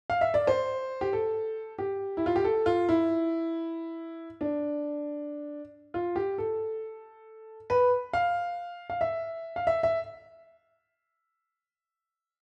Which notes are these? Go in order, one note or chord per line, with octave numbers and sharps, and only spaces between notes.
F5
E5
D5
C5
G4
A4
G4
E4
F4
G4
A4
F4
E4
D4
F4
G4
A4
B4
F5
F5
E5
F5
E5
E5